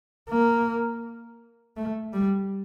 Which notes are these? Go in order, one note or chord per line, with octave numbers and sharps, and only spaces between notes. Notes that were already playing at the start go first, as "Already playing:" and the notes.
A#3
A3
G3